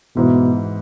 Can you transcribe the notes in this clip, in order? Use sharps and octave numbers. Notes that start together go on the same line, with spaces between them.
G#2 B2 E3 B3 E4